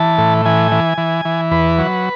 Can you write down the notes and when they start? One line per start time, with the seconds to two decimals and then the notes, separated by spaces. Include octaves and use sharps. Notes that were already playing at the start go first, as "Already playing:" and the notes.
Already playing: E3 A5
0.18 A2
0.45 E3 G#5
0.72 E3
0.98 E3
1.25 E3
1.51 E2 B4
1.78 F#3